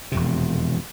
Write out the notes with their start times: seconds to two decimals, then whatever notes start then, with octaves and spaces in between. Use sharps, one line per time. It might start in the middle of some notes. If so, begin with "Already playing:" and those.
0.12 E1 F2 C3